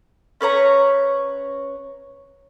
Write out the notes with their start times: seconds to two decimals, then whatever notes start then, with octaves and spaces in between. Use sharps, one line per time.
0.41 C#4 B4 C#5 A#5